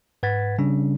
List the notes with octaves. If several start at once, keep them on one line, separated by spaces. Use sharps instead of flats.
G#2 B4 F#5 G#6 A6 B6
C#3 G3 C#4 D4